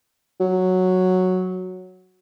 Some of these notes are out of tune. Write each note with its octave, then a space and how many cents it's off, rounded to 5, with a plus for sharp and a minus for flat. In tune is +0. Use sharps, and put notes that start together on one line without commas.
F#3 -5